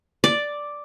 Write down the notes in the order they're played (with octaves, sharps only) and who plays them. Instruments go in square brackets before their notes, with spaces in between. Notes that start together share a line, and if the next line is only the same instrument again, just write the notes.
[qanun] D5